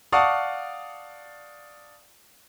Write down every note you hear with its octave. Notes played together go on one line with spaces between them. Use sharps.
D5 F5 F#5 A5 C#6 D#6